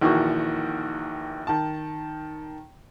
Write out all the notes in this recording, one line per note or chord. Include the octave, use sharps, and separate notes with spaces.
A#1 D#3 E3 A#3 F#4 C#6
D#3 A5